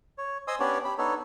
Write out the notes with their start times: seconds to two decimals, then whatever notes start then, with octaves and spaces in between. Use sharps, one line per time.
0.18 C#5
0.48 C5 D#5 G#5 C6 D#6 E6
0.60 B3 C#4 D4 G4 C#5 D5
0.85 G4 B5
0.98 B3 D4 D#4 A4 C#5